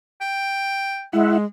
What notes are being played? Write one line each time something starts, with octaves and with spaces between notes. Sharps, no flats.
G5
G#3 E4 E5 F#5